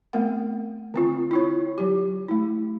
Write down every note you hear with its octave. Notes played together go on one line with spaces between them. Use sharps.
A3 B3 C4 A#4 F#5
D3 C4 F4
E4 F4 C#5
F#3 G4
A3 E4